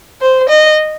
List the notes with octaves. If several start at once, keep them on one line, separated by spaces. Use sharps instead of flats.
C5
D#5